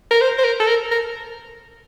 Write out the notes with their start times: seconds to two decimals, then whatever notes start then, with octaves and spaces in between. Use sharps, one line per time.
0.11 A#4
0.21 C5
0.38 C5
0.44 A#4
0.60 A4
0.68 A#4
0.91 A#4